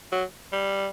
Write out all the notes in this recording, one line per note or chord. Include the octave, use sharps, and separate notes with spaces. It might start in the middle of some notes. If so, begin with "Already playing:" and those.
F#3
G3